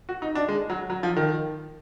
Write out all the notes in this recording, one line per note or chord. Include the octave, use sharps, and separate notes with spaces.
F#4
D#4
D4
G#3
F#3
F#3
F3
D#3